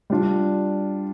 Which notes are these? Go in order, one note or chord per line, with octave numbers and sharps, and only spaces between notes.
G3 D4 F4